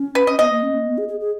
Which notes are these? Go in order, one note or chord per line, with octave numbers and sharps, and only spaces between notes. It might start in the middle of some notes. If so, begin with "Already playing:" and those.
Already playing: C#4
B4
D#5
B3 D#5
A#3
C#4
A#3
B3
G#4
G#4
G#4